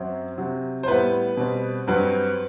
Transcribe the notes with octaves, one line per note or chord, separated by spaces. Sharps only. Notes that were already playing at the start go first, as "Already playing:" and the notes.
Already playing: F#2 F#3 C4
C3 F#3 C4
C5
A2 G3 B3 B4
B2 G3 C4
G2 F#3 C4 B4